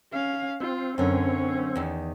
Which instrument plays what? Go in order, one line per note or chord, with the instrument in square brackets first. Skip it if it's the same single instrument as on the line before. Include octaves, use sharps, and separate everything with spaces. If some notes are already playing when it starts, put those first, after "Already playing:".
[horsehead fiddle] C#4 F5
[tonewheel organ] C4 [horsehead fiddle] F4
[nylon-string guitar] F#2 D3 [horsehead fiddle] C#4 C#5
[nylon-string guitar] E2 D#3